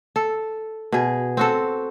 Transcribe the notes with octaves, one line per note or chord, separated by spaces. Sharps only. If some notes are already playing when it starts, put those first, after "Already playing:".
A4
B2 G#4
C4 F#4 A4